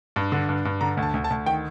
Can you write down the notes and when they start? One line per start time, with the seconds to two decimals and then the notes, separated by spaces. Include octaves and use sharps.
0.16 G2
0.32 D3
0.49 G2
0.65 G2
0.81 D3 A#5
0.97 D2
1.02 A5
1.14 D2
1.24 A5
1.30 D2
1.46 D#3 G5